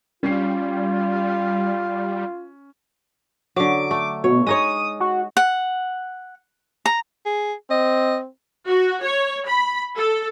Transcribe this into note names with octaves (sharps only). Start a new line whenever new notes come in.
G3 C#4 F4 C7
D3 F#3 D6
A3
B2 C#5
G#3 D#4 C#5 D#6
F#4
F#5
A#5
G#4
C4 D#5
F#4
C#5
B5
A4